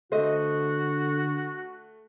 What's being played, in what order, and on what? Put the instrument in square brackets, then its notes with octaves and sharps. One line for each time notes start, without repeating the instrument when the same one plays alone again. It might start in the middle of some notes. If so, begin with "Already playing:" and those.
[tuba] D3 [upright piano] A3 [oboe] F#4 [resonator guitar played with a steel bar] C5 D#5 E5